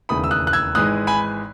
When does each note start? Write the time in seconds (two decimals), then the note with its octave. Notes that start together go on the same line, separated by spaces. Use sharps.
0.09 E1 D#2 C#3 E3 A3 B5 D#6
0.24 E6
0.31 D#6 F#6
0.47 F#6
0.53 E6 G#6
0.75 G#1 G#2 E3 G#3 D#6 F#6
1.07 G#5 B5